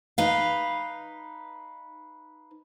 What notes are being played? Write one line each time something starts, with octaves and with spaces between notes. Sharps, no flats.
D#4 B4 F5